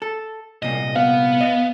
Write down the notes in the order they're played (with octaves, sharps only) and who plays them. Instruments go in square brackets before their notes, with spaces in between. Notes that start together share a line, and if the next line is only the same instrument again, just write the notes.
[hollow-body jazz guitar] A4
[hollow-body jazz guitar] C2 A#2 [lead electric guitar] D#5
[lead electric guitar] B3 [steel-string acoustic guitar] F5
[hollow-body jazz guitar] D#5